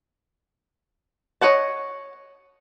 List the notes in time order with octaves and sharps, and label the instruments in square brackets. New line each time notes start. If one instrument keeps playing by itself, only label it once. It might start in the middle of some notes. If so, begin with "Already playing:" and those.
[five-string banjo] C#5 D#5 F#5 A5